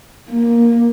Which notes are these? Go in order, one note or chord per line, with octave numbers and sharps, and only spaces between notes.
A#3